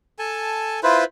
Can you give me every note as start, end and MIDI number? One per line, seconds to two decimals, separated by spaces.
0.19 0.80 69
0.19 0.80 80
0.19 0.80 81
0.83 1.04 64
0.83 1.04 65
0.83 1.04 71
0.83 1.04 72